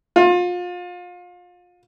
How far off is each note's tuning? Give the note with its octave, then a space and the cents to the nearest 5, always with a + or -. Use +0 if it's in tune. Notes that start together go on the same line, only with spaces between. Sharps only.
F4 +30